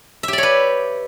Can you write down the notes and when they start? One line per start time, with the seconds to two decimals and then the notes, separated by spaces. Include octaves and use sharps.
0.23 E5
0.28 G4
0.33 D5
0.38 C#5
0.43 B4